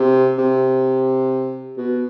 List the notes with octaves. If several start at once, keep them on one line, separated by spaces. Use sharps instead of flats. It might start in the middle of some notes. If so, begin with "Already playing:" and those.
Already playing: C3
C3
B2